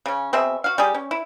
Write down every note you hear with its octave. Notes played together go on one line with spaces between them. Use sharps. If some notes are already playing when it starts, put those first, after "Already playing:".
C#3 C#4
B2 C4 G#4 E5
F#4 F5
G3 G4 G#4
C#4
E4